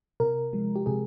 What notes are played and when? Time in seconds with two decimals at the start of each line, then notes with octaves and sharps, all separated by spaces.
0.20 C3 A#4
0.53 F3 G#3
0.76 G4
0.86 C3 G#4